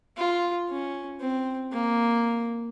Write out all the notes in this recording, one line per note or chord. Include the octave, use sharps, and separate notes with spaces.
F4
C#4
C4
A#3